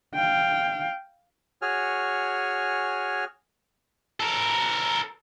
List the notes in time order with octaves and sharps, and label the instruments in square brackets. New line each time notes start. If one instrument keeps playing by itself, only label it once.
[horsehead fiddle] F5 G5
[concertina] F#4 G#4 C#5 G#5 F6
[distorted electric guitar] A4 A#4